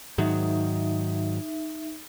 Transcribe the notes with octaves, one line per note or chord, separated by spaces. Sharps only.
G#2 D#3 F#3 D#4 E5